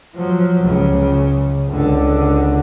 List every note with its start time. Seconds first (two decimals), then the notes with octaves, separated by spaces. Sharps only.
0.15 F3 F#3
0.62 C#2 C#3
1.69 C#2 D3